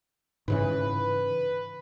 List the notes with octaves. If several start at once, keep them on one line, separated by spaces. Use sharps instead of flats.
G#2 C#3 E3 B4